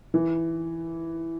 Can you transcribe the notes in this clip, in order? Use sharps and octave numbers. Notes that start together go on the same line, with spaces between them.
E3